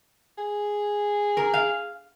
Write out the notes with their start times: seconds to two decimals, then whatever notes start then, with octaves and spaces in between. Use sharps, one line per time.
0.38 G#4
1.37 A#4
1.54 F5